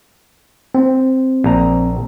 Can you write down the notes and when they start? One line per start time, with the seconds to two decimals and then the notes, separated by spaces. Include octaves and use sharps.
0.75 C4
1.44 A#1 A#5